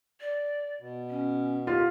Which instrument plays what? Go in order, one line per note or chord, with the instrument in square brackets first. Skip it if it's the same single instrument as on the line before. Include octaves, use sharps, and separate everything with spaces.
[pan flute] D5
[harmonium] B2
[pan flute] C#4
[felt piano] F4 [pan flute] G4